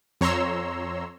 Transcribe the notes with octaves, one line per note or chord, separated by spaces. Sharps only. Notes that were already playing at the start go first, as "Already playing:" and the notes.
F2 C#5 A#5 C6 E6